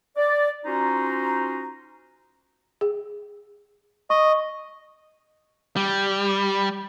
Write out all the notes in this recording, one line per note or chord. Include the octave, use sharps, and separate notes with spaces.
D5
C#4 D#4 F4 F#4 C5 A#5
G#4
D#5 C#6
G3